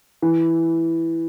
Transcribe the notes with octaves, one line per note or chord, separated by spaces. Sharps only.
E3